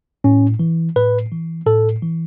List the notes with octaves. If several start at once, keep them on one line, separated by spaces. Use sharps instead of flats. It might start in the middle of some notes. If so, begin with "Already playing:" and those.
A2 C#4
E3
A2 B4
E3
A2 A4
E3